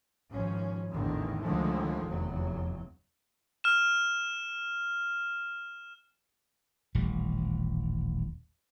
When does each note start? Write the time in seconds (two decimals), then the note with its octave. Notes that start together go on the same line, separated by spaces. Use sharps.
0.29 G#1 G#2 F3 C#4
0.91 A1 E2 D3 D#3
1.41 C#2 D3 D#3 F3 G#3 A3
2.06 F1 E2 F#3
3.64 F6 E7
6.95 D#1 A1 G3